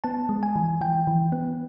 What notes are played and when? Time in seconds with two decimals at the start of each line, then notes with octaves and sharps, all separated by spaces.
0.04 B3 A5
0.29 G#3
0.43 G#5
0.56 E3
0.81 E3 G5
1.07 E3
1.32 B3